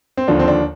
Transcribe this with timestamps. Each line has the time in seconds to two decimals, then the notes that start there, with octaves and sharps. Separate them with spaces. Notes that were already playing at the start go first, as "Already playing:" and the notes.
0.17 C4
0.28 D#2 D3 F3 D4
0.39 C4
0.48 D4